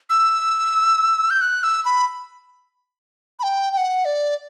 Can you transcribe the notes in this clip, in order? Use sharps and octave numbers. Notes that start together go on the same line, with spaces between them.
E6
G6
F#6
E6
B5
B5
G5
G5
F#5
D5